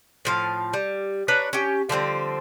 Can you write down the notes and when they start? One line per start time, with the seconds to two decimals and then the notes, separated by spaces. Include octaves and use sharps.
0.25 A2 F3 F5
0.73 G3
1.28 D4 B4 C#5 A#5
1.53 C#4 G4
1.89 D3 F3 G3 C4